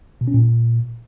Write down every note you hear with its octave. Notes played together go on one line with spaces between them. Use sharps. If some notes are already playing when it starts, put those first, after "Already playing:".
B2
C#4
A#2